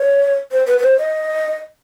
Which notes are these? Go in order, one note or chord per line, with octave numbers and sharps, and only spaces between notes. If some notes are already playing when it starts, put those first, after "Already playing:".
Already playing: C#5
C5
B4
B4
C5
D#5